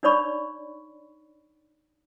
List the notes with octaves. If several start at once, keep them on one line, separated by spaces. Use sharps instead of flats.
D4 D#4 C#5 D5 B5 C#6